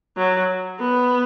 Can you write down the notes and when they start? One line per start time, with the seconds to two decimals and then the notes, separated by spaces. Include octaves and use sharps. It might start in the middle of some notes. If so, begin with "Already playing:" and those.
0.17 F#3
0.79 B3